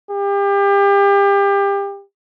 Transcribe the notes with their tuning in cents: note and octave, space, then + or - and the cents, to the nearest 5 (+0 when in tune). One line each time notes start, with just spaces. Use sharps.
G4 +30